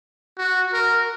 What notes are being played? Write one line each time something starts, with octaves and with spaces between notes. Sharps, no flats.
F#4
A#4